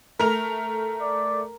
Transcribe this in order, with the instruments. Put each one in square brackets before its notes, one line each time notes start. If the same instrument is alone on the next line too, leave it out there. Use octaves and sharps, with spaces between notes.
[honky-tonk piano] A3 F7 [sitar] A#4
[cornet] D5